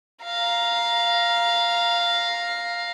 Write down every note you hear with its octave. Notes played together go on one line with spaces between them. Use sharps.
F5 A#5